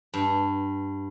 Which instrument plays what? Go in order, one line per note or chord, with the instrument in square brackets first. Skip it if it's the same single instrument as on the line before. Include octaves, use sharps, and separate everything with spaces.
[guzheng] G2